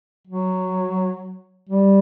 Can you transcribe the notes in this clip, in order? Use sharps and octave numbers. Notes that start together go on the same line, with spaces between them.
F#3
G3